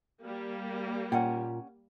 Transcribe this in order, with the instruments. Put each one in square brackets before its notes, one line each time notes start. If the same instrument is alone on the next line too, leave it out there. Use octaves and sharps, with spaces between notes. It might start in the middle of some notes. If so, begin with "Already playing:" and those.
[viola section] G3 A#3
[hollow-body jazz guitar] A#2 [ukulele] C#4 F#5 G5